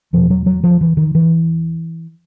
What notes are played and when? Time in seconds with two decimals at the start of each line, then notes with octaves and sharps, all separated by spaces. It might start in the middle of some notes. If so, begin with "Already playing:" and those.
0.13 E2 B2 F3
0.30 F#3
0.46 F#3
0.64 F3
0.81 E3
0.97 D#3
1.15 E3